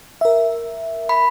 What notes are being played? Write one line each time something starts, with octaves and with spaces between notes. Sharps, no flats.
A#4 E5
B5